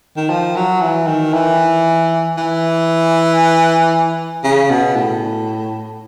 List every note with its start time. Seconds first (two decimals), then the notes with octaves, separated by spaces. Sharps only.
0.17 D#3
0.30 F3
0.56 F#3
0.81 E3
1.07 D#3
1.34 E3
2.37 E3
4.44 C#3
4.70 B2
4.96 A2